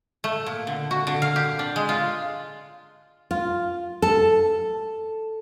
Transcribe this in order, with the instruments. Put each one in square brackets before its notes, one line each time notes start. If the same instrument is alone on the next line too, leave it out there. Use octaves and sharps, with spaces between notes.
[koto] A3
A#2
D3
F#4
D3
F5
G4
D4
G#3
F4
[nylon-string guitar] F4
A4